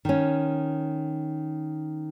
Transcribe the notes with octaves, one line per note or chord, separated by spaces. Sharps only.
D#3 C#4